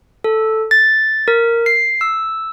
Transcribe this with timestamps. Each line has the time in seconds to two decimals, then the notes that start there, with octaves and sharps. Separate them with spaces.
0.24 A4
0.71 A6
1.28 A#4
1.66 C7
2.01 E6